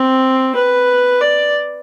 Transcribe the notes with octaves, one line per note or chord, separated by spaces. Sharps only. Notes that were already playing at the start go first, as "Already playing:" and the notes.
Already playing: C4
B4
D5